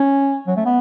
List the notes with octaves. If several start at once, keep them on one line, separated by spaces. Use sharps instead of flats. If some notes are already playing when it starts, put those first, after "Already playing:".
Already playing: C#4
F#3
A3
B3